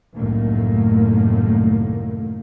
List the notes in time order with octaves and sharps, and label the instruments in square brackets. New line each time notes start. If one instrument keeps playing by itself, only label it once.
[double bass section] C2 F#2 A2 D#3 A3 A#3